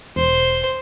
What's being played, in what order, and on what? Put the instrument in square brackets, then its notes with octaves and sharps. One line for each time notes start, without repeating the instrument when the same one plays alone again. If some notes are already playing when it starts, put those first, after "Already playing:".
[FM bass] E1 [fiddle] C5